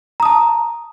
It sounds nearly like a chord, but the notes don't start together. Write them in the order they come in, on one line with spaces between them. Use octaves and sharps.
A#5 D#6 A5